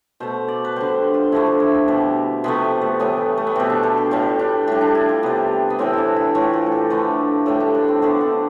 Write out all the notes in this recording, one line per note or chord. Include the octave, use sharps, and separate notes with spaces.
B2 A3 C5
D5
B4
D3 G3 C5
F4
D3 F3 A3 E4
F4
E4
C4
B2 G3
C3 F3 A3 B3
A3
A2 E3 G3 B3
A3
B3
B2 G3 C4
D4
A4
G4
A2 G3 F4
D4
A2 G3 D4
D4
E4
F4
C3 G3 B3
B3
A2 E3 G3 C4
D4 E4
E4
A2 E3 A3 F4
F4
A4
G4
D3 F3 A3 B4
A2 G3 A4
D4
D4
C4
D3 A3 B3
C4